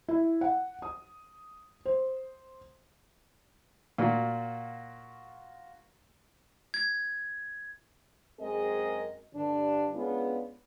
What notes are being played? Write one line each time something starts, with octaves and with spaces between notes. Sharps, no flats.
E4
F#5
D#6
C5
A#2 F4 F#4
G#6
F#2 G#3 C4 G#4 A#4 D#5
G2 D3 D4
G#3 B3 C#4 D4 F4 G#4